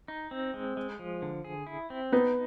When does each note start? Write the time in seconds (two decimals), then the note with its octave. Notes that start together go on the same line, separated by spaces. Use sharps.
0.08 D#4
0.31 C4
0.54 G#3
0.77 G#3
0.99 F3
1.22 D3
1.44 G#4
1.67 E4
1.90 C4
2.12 B3 D#4